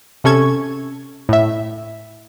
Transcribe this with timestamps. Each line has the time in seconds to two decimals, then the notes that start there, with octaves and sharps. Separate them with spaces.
0.24 C3 C#4 A4 C#6 G#6
1.29 A2 E5